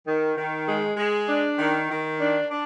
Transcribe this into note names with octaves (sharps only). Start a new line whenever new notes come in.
D#3
D#3
G#3
G#3
D4
D#3
D#3
D4
D4